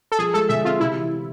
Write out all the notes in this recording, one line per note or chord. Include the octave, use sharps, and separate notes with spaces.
A4
F3 G#4
G#3 A4
D3 E5
C4 F4
C3 E4
E3